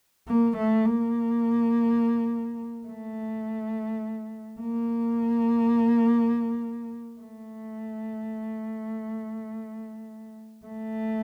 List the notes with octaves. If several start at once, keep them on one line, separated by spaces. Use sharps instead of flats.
A#3
A3
A#3
A3
A#3
A3
A3